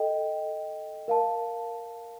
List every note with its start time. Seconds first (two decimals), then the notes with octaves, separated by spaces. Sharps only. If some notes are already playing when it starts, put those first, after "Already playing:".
Already playing: A4 D#5 G5
1.08 A#4 F5 A5